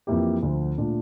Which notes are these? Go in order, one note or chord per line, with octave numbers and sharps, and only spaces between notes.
F2 E3 A#3 E4 G4
D2 D3 F3
A#2 A3 D4 F4